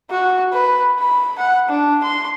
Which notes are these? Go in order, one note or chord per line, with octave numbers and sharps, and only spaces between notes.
F#4
B4
B5
F#5
D4
C6